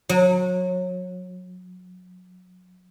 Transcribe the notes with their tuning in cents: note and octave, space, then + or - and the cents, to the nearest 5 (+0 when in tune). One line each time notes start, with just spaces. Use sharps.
F#3 -25